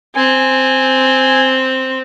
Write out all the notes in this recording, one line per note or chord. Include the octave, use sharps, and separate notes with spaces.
C4 G#5